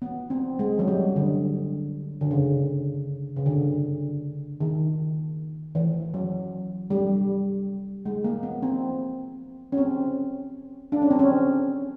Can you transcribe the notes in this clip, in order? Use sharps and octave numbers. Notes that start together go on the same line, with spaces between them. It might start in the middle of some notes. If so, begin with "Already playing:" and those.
B3
C4
G#3
F#3
G3
D3
D3
C#3
C#3
D3
D#3
E3
F#3
G3
G#3
A#3
B3
C4
C#4
C4
D4
C#4
C4
C#4